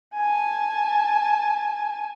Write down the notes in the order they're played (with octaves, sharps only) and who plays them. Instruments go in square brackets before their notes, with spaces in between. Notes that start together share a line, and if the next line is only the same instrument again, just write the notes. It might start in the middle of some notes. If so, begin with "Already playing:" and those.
[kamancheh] G#5 A5